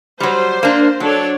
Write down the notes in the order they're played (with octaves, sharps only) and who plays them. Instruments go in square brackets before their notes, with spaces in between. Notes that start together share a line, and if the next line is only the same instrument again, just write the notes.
[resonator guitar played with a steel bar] F#3 G3 [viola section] C5
[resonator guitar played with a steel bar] A#3 D4
[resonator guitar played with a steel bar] F#3 [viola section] D4 A4 C#5